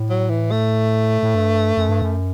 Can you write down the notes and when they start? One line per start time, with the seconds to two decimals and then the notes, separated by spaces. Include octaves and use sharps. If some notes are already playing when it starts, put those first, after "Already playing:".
Already playing: A2
0.09 F#3
0.30 E3
0.51 A3
1.23 A2
1.35 G2
1.77 F#2
1.89 G2
2.02 F#2